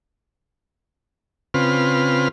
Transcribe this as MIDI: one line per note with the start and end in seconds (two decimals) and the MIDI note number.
1.54 2.28 49
1.54 2.28 60
1.54 2.28 65
1.54 2.28 71
1.54 2.28 89